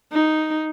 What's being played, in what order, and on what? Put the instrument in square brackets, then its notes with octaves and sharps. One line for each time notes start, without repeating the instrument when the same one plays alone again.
[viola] D#4